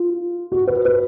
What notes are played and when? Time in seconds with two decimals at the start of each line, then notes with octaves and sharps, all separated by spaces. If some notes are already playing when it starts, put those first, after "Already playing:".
Already playing: F4
0.52 F#4
0.67 B4
0.85 B4